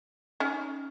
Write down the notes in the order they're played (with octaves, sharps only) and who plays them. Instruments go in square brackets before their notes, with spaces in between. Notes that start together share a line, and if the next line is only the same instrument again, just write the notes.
[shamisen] C#4 D#4